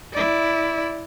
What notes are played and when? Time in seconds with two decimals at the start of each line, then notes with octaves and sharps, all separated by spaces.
0.13 E4 D5